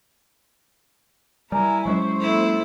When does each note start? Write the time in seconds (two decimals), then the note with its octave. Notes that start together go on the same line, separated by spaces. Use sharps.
1.52 G3 E4 A#4 G#5
1.86 F#3 G#3 C#4 C5 C#6
2.21 A#3 E4 A4